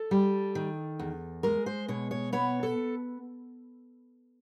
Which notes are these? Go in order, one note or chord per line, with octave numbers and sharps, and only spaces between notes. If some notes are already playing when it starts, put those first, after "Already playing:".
Already playing: A4
G3
D#3
E2
G#3 A#4
C5
B2 C#5
C#5
B3 C#5
A4